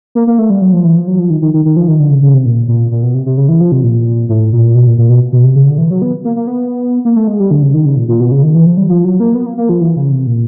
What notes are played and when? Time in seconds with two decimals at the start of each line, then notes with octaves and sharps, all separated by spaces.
0.15 A#3
0.27 A#3
0.39 A3
0.50 G3
0.62 F#3
0.73 F3
0.84 E3
0.96 F3
1.07 F#3
1.19 F3
1.30 D#3
1.42 D#3
1.54 D#3
1.65 D#3
1.76 F3
1.88 D#3
2.00 D3
2.11 C#3
2.22 C#3
2.34 C3
2.45 A#2
2.68 A#2
2.91 A#2
3.03 B2
3.14 C3
3.26 C3
3.37 C#3
3.49 E3
3.60 F3
3.72 C3
3.83 A#2
4.29 A2
4.53 A#2
4.75 B2
4.87 A#2
4.98 A#2
5.09 B2
5.33 B2
5.44 C3
5.55 C#3
5.67 D3
5.78 E3
5.90 F#3
6.02 B3
6.25 A#3
6.36 A#3
6.47 B3
7.05 A#3
7.16 A3
7.28 G#3
7.40 G3
7.51 D3
7.63 C#3
7.74 D#3
7.85 C#3
7.97 A#2
8.08 A#2
8.20 B2
8.31 C#3
8.43 D#3
8.55 E3
8.66 F3
8.77 G3
8.89 F3
9.04 F#3
9.20 A#3
9.35 B3
9.46 A#3
9.58 A#3
9.69 F3
9.81 E3
9.96 C#3
10.11 C3
10.27 A#2